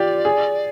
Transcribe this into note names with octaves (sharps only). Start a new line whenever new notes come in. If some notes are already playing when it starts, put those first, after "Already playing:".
Already playing: F4 G4 D5
G#4